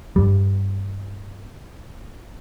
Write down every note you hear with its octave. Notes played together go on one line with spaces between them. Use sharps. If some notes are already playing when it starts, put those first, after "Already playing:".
G2 G3